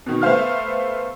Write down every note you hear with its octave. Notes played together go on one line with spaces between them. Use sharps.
B2 D#3
A3 B3 C5 F5 F6